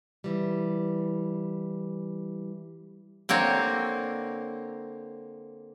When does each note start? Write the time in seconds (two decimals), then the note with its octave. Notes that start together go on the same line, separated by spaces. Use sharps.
0.24 E3 G3
3.29 D3 A#3 C4 C#5